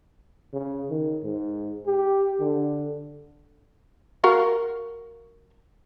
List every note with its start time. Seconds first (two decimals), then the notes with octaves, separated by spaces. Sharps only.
0.53 C#3
0.90 D#3
1.24 G#2
1.86 G4
2.40 D3
4.24 F#4 A#4 F5